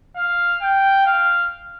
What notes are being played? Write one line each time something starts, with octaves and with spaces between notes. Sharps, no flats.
F5
G5
F5